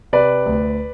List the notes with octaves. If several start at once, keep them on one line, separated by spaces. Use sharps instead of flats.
C3 B4 D5
D2